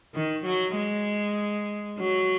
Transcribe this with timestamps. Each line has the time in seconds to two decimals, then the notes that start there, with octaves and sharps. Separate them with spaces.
0.14 D#3
0.45 F#3
0.76 G#3
1.99 F#3